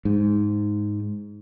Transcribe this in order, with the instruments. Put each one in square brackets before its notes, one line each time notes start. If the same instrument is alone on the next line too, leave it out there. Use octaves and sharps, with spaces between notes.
[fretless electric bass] G#2